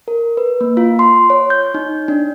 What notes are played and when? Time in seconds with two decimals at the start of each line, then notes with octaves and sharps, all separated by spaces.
0.08 A#4
0.37 B4
0.61 A#3
0.77 F4
0.99 C6
1.30 C#5
1.50 G6
1.74 D#4
2.08 D4